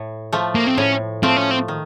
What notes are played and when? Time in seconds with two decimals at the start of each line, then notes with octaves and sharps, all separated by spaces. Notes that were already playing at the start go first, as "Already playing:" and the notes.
Already playing: A2
0.33 F3 A3
0.55 A#3
0.67 C4
0.78 A2 C#4
1.23 F3 A3 C4
1.37 C#4
1.51 C4
1.68 D#3